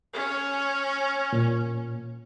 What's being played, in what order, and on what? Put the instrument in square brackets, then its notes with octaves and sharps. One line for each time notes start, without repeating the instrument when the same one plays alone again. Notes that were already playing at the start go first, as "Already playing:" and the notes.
[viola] C#4
[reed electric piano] A#2